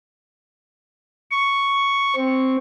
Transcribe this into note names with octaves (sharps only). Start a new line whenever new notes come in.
C#6
C4